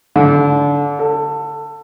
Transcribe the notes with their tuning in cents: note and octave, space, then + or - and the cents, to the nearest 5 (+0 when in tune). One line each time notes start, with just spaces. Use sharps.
D3 -30
A4 +20